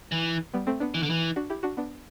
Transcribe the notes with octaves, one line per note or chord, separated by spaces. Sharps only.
E3
G3 B3
A3 C4
B3 D4
E3
D3
E3
D4 F#4
E4 G4
D4 F#4
B3 D4